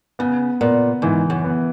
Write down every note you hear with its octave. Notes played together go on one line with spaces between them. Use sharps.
C#3 B3
A#2 B3
G#2 E3
F#2
B3